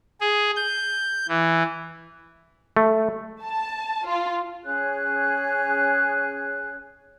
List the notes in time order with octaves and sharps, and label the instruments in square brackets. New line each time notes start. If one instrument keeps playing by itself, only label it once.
[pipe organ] G#4
G6
E3
[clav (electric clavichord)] A3
[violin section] A5
F4
[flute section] C#4 G#4 C#5 F#6